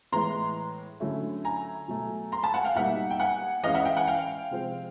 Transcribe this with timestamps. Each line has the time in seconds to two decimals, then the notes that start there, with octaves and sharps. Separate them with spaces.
0.12 A2 E3 G#3 B3 A#5 C6
1.00 D3 F#3 A3 C#4 E4
1.45 G#5 A#5
1.88 B2 F#3 A3
2.32 A#5 C6
2.43 A5 B5
2.54 F#5 G#5
2.65 F5 G5
2.75 B2 G3 A#3 D#4 E5 F#5
3.11 G5
3.20 F#5 G#5
3.63 E3 G#3 C#4 E4 D#5 F5
3.74 E5 F#5
3.85 F5 G5
3.97 F#5 G#5
4.08 F5 G5
4.51 C3 F3 G#3 C4